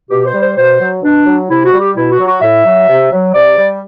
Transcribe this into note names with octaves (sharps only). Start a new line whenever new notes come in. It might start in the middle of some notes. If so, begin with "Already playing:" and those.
B2 G4
C5
G3
C5
B2 C5
F#3
B2 D4
F#3
C3 E4
F#4
G3
G4
B2 E4
F#4
F#3
F#4
A2 E5
F#3
C3
F#3
C3 D5
G3